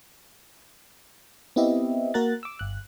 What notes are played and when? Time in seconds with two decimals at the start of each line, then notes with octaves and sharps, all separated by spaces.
1.56 B3 C4 E4 G4 D#5 E5
2.14 A#3 F#4 A#4 A#5 F#6 A6
2.43 D6 E6
2.59 G1 F#6